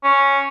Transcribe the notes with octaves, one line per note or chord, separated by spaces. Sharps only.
C#4